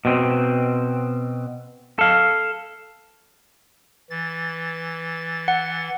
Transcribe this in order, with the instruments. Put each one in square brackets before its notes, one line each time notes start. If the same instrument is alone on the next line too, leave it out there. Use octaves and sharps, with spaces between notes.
[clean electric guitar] B2 C4
A4 F5
[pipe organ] E3 A6
[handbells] F#5